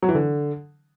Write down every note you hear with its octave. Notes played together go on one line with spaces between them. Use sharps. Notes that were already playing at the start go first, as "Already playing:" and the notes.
F#3
E3
D3